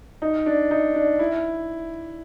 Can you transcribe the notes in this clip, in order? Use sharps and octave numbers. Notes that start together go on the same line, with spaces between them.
D#4
D4
D#4
D4
E4